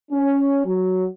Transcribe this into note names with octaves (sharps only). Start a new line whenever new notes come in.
C#4
F#3